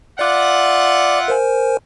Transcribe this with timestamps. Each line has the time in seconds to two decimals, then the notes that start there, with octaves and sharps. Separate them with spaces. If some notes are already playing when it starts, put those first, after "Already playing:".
0.19 F4 D5 E5 F#5 D6
1.28 A#4 C5 G#5